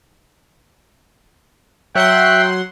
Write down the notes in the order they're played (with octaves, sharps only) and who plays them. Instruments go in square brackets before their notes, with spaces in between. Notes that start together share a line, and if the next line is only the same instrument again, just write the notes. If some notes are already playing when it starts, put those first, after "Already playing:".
[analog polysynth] F#3 F#5 C6 [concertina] E5 F#6 [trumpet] G5